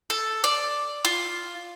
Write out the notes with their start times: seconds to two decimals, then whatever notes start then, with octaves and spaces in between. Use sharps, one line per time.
0.10 A4
0.44 D5
1.05 F4